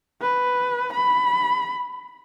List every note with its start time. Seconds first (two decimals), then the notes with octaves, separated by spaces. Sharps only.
0.22 B4
0.93 B5